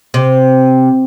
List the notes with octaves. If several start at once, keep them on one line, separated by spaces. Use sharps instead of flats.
C3